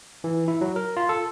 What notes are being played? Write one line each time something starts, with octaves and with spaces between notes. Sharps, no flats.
E3
E4
F#3
A#4
F4
A4